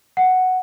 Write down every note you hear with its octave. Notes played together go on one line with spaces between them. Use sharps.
F#5